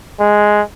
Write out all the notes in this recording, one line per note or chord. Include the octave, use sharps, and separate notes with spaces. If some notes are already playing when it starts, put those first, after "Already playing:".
G#3